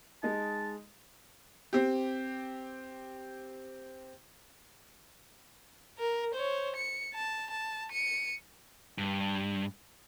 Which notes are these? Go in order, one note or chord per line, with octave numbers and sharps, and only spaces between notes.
G#3 D#4 A5
C4 G4
A#4
C5 C#5
C#7
A5
A5
C#7 D#7
G2